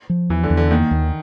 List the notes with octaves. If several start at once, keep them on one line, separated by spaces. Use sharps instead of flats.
F3
E2 E3
D3
E2
D3
D#3 A#3
D#2